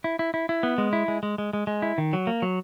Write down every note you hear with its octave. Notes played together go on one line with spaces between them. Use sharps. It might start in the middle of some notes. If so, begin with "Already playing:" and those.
E4
E4
E4
E4
B3
G#3
E4
G#3
G#3
G#3
G#3
G#3
E4
D#3
F#3
A#3
F#3